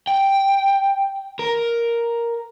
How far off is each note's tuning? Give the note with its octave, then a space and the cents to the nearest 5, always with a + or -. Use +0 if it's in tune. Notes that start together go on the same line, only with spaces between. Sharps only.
G5 +0
A#4 +5